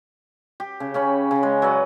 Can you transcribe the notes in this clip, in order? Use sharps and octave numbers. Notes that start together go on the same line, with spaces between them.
G4
C#3
C#3 C#4 B5
C#3
G#3
F#3 B4 D5